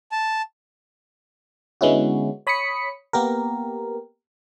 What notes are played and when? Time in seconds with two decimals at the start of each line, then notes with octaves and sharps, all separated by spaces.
0.12 A5
1.81 D3 G#3 B3 C#4 E4 F#4
2.47 C#5 B5 D#6 B6 C#7
3.13 A#3 B3 G4 A#4